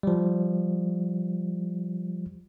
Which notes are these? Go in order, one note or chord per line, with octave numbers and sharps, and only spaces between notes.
F3 G3